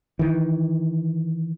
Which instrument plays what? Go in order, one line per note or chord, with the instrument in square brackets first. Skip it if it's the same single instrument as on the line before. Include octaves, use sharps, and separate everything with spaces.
[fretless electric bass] D#3 E3